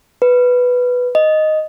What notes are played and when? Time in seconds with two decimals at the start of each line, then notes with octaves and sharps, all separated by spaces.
0.22 B4
1.15 D#5